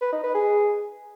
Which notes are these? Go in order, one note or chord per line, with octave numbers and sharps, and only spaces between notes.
B4
D#4
B4
G#4